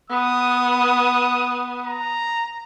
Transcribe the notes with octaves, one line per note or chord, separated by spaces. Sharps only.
B3 D#6
A#5